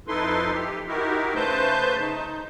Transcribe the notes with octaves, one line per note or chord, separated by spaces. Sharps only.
F2 D#4 E4 A4 B4 C6
G4
D#4 E4 F#4 G4 A#4
C#3 A3 B4 C5 A5 G6
D#4